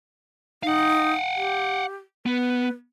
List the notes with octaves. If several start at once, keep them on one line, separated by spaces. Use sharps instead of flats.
D#4 F5 F#5
G4
B3 B4